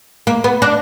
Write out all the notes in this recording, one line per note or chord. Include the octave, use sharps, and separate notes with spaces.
A#3
B3
D4